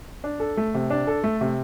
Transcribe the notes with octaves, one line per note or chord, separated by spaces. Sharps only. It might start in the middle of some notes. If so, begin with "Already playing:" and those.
D4
A4
A3
C3
D4
A4
A3
C3